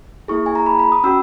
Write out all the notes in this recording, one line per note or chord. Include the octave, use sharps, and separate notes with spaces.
A#3 E4 G#4 C#6
G#5
A#5
B5
B5
D#6
C#4 F#4 E6